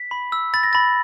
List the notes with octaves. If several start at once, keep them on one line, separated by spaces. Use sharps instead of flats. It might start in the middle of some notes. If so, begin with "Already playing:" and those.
Already playing: B6
B5
E6
B5 A6
A#6
B5 A6